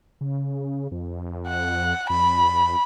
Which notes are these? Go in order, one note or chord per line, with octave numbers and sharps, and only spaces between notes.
C#3
F2
F#5
F2 B5